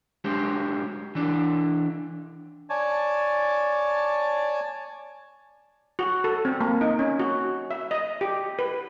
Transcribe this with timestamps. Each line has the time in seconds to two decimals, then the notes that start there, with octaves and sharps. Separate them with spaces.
0.24 G#3 D4 F#4 G4 C5
1.15 E3 D4
2.70 C#5 D5 G#5 A5
5.99 F#4
6.24 A4
6.45 C4
6.60 A#3
6.81 D#4
6.99 C#4
7.20 F#4
7.71 E5
7.91 D#5
8.21 G4
8.59 B4